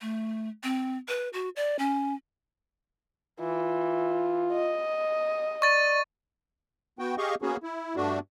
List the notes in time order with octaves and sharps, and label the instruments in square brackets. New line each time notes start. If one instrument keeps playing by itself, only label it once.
[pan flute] A3
C4
B4
F#4
D5
C#4
[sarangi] E3 [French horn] F4
[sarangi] D#5
[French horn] D5 [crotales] C#6 A6 D#7
[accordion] B3 F#4 G5
G4 G#4 D#5 F5 C#6
A#3 B3 C#4 F#4 G#4
E4
G2 A3 D4 F#4